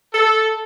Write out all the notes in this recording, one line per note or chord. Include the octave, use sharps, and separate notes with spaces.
A4